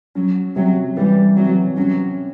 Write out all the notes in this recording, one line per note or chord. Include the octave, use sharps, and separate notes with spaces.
F#3 C#4
C3 F#3
E3 G3
C3 F#3
F#3 C#4